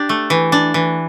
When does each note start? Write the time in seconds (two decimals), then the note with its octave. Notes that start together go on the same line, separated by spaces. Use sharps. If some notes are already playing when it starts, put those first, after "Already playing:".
Already playing: D4 G4
0.09 A3
0.30 E3
0.52 D4
0.74 E3